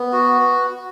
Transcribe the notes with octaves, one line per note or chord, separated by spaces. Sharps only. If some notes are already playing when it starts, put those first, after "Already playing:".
Already playing: B3
F#4